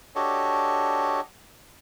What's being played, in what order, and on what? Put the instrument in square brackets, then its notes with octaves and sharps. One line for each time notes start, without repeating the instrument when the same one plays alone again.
[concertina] D4 F#4 G4 A4 C#5 D#5